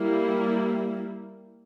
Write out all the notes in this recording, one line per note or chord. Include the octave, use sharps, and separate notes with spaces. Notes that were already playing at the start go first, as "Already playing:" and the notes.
Already playing: G3 A#3 E4